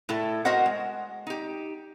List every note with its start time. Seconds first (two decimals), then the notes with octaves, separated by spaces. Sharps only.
0.09 A2 E4 A4
0.45 F#4 A#4 C5 D#5 F#5
0.66 G#3
1.27 D#4 G4